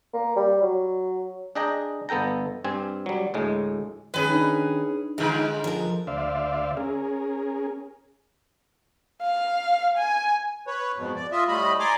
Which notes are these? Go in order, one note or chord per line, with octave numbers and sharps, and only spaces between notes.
A#3
G3
F#3
D4 G#4 D#5 G5 A#5
G1 B3 A4 G5 A#5
G2 C4 G#5
F#3 G3
D2 A2 G#3
D#3 C#4 G#4 B4
D4 D#4
G#2 D3 G#3
F3 A#4
D2 C5 D5 E5 F5
C#4 G#4 A#4
F5
G#5
B4 C#5
F2 G#2 B2
D5
F4 D#5 E5
A2 G3 A3 D#5 B5
D5 G#5 A#5 C6 D6